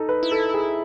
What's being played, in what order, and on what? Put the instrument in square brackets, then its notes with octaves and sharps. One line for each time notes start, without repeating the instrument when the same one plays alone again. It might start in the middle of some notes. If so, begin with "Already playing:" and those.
Already playing: [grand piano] D#4 A4
B4
[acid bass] E4
[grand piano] A4
G#4